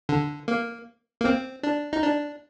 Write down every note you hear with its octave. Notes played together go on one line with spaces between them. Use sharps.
D3
A#3
A#3
C4
D4
D#4
D4